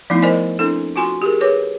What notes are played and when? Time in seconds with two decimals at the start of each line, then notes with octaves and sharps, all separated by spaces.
0.10 F3 A3 B3 D#4 E4
0.22 A#4 C5 D5 D#5 G#5
0.59 C4 D4 E4 A4
0.96 F4 F#4 G#5 C6
1.22 G4 G#4 A#4
1.41 G#4 B4 C#5 D6